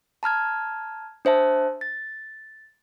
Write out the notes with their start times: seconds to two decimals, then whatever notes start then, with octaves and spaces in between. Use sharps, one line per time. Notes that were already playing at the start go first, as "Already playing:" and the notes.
0.23 A5 A#5 F6 G#6
1.25 D4 C5 E5 A5
1.81 A6